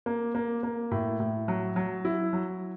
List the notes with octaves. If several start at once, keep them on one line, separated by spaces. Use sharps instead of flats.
A#3
A#3
A#3
A2
A2
F#3
F#3
E4
F#3